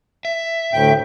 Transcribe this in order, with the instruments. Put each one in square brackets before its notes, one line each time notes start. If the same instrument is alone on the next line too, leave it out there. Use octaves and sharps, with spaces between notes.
[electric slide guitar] E5
[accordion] D2 A2 G5